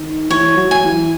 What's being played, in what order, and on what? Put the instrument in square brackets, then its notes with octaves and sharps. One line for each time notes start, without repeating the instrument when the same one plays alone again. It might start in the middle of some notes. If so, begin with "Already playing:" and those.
Already playing: [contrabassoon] D#3
[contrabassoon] E3 [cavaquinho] C#5
[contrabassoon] F#3
[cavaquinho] G#5
[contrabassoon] E3